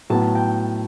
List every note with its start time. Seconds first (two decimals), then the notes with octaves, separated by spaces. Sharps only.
0.10 A2 F#3 B3 A5
0.35 G5